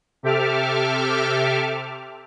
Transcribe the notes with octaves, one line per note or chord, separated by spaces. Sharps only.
C3 G4 A4 E5 D6 F6